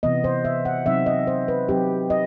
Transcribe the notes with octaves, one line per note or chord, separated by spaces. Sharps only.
C3 E3 B3 D#5
C5
E5
F#5
C3 F#3 C4 D#4 E5
D#5
C5
B4
F#3 C4 D#4 G4
D#5